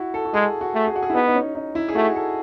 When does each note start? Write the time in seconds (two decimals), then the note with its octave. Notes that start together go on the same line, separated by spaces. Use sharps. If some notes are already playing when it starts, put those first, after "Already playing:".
Already playing: E4 F#4
0.14 A4
0.25 F#4
0.34 G#3 G#4
0.61 F#4
0.74 A3
0.87 G#4
0.96 F#4
1.03 G#4
1.10 E4
1.14 B3 D#4
1.28 D#4
1.35 C#4
1.55 D#4
1.75 E4
1.89 G#4
1.95 A3 F#4
2.15 A4